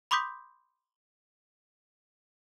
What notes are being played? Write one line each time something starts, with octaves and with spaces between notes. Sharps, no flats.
B5 C6 D6 D#6 G6 B6